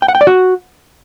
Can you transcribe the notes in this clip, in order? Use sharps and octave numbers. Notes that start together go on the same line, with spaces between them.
G5
F#5
G5
D5
F#4